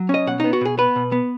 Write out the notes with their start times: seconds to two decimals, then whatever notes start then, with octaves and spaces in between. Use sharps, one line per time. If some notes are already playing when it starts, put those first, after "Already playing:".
Already playing: F#3
0.09 C#4 D#5
0.27 B2 F#5
0.40 B3 D#4
0.53 F#4
0.61 B2 G#4
0.78 B3 B4
0.96 B2
1.12 B3